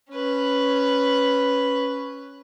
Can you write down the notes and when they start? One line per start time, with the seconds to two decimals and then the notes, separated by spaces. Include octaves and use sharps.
0.11 C#4 B4